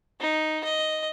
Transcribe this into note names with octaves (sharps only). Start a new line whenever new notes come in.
D#4
D#5